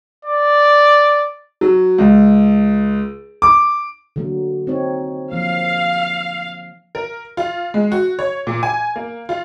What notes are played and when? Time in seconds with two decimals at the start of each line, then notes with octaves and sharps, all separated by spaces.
0.25 D5
1.61 F#3
1.98 C#2
3.42 D6
4.16 D3 F#3 A#3
4.67 C4 D#4 C#5
5.32 F3 A#3 F5
6.95 A#4
7.37 F4
7.74 G#3
7.92 F#4
8.19 C#5
8.47 A#2
8.63 G#5
8.96 A#3
9.29 F4